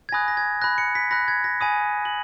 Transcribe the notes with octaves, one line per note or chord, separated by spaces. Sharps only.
G#6
G#5 B5 D#6 F#6 A#6
A#6
G#6
B5 F#6 A#6
C#7
B6
B5 F#6 A#6
G#6
A#6
G#5 B5 D#6 D#7
F#7